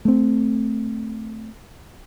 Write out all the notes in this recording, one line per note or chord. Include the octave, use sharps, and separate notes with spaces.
A3 C4